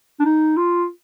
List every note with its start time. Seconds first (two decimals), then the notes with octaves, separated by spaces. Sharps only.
0.20 D4
0.25 D#4
0.57 F4